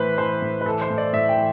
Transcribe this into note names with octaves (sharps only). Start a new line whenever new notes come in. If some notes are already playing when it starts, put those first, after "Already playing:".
Already playing: A2 E3 B4 C5
E3 C5
A2
B4
E3 A4
C5
A2
D5
A2 E5
G5
E3